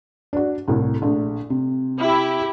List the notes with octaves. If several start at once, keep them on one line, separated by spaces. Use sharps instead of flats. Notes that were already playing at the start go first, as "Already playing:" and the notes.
D4 F#4
C2 A2
A#1 A3
C3
E4 G4